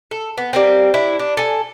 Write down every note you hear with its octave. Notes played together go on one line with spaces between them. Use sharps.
A4
B3
G3 A#3 C4
D4 E4
D4
A4 G#5